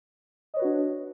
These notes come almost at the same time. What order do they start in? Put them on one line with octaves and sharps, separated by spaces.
D#5 C#5 B4 F#4 D4